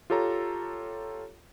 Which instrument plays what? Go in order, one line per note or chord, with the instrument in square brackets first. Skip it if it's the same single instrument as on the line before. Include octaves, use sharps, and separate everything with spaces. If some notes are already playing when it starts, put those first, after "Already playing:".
[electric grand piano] F4 G4 A4 C#5 A#5